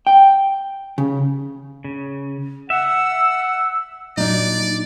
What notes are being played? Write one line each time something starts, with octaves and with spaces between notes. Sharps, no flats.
G5
C#3
C#3
E5 F#5 E6
A#2 F#3 D4 D#4 D5